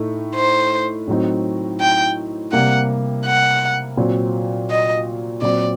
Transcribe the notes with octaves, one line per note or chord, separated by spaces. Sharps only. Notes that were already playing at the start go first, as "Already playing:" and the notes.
Already playing: A2 A3 D#4
C5
A2 F#3 C4 D#4
G5
C3 G3 A#3 F#5
F#5
A#2 F#3 C4
D#5
A#2 F#3 C4 D5